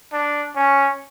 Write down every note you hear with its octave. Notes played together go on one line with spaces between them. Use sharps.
D4
C#4